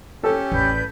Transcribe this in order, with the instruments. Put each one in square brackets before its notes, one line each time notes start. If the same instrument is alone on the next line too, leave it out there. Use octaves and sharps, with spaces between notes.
[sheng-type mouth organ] C#4 G4 [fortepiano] A4
[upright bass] A1 E2 [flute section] B4 D5 G6